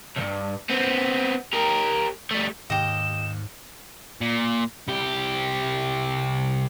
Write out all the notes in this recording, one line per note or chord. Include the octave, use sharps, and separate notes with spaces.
B1 G2
B3 C4
G4 A#4
G3 A3
D#2 G#2 G4 D#5 E7
A#2
C2 G4